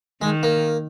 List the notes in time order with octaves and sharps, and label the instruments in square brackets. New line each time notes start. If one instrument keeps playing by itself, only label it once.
[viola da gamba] D#3 [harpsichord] G#3
[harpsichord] A#3